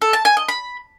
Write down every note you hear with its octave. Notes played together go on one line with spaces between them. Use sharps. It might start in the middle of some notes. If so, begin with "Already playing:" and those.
A4
A5
G#5
D#5
B5